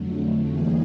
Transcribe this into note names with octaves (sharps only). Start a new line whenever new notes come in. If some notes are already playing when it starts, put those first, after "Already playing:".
Already playing: F2 D3 F#3 A3
E3 G3 A#3 D#4 G#4